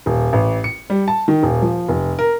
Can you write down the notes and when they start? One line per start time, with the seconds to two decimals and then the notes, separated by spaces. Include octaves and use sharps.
0.06 D#1
0.33 A1
0.64 C#7
0.90 G3
1.08 A5
1.28 D#3
1.43 D#1
1.62 F3
1.89 F1
2.19 A#4